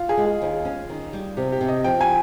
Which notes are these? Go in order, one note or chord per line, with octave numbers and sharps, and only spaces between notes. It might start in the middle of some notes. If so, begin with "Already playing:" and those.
Already playing: F4
G#4
G#3
G#4
D#2
C#4
D#3
G3
C3 G4
G4
C3
D#5
F3 G5
G#5